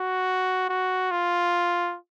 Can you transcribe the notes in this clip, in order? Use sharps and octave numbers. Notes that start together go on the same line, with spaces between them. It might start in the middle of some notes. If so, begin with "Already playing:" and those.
Already playing: F#4
F#4
F4